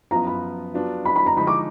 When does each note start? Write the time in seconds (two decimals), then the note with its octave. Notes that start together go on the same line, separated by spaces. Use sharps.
0.11 F#2 F3 B3 F4 B4 A#5
0.27 B5
0.74 F#3 B3 D4 F4
1.05 B5
1.16 B5
1.26 A#5
1.37 D3 F3 G#3 D#4 B5
1.47 D6